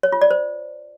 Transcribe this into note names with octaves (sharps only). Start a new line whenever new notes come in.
C#5
F4
D5
C5